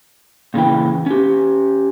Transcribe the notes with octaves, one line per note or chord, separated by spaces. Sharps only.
A#2 C#3 E3 G5
C#4 G4